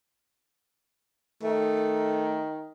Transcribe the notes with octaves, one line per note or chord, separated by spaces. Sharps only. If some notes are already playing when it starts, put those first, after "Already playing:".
D#3 A3